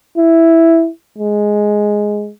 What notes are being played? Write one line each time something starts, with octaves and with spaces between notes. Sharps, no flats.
E4
G#3